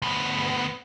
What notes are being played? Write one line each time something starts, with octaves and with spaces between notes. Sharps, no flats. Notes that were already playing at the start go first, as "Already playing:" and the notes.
D2 B3